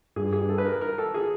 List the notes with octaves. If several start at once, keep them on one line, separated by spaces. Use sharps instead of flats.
G2 G#4
G#4
A4
B4
A#4
A#4
A4
G#4